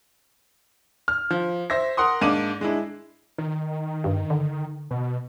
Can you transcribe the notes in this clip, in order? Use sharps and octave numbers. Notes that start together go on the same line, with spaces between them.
F6
F3
C5 E5 A#6
A#4 F#5 C6 D#6
G#2 A#3 D4 D5 D#7
G#3 D4 E4
D#3
G2
D3
B2